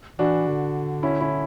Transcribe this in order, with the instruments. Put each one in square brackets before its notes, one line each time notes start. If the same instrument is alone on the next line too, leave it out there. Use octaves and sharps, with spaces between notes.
[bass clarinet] E3 [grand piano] D4 F#4
[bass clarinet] D3
[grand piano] C#4 E4
C#4 E4